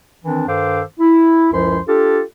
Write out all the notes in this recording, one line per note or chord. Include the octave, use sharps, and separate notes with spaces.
D#3 E3 C4 D4
G2 D#3 A4 C5 F5 D6
E4
C#2 F#2 F3 E4 C5 C6
D4 F4 G4 A4